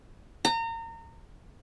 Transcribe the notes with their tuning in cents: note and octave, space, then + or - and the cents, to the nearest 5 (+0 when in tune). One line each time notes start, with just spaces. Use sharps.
A#5 -30